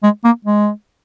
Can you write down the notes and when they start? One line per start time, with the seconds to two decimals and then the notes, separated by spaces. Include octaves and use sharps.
0.03 G#3
0.24 A#3
0.45 G#3